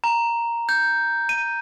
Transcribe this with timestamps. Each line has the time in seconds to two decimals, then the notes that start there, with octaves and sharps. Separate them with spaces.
0.04 A#5
0.69 G6
1.29 D#7